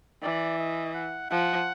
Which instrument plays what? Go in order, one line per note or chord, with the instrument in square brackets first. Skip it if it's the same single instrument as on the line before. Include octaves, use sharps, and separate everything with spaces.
[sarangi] E3 [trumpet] D5
[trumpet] D#5
F#5
[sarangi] F3 [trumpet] F#5